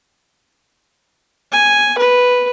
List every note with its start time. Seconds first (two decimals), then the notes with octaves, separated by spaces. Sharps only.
1.52 G#5
1.98 B4